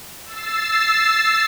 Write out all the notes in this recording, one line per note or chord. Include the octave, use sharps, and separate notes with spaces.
E6 A6 C7